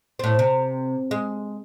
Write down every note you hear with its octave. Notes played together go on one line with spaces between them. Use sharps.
A2 C4
C3
G#3